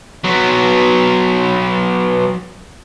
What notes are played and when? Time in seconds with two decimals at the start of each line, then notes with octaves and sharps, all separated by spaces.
0.24 F#3 B3